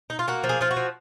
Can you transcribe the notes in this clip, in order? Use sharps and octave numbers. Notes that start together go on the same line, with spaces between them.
D#4
F4
A#3 F#4
F3
G#4
F3 F4
F#4
F3